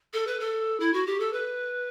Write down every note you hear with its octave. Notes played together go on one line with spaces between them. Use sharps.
A4
B4
A4
E4
F#4
G4
A4
B4